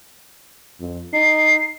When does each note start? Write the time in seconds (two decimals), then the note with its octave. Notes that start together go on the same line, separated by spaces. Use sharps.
0.80 F2
1.13 D#4 C7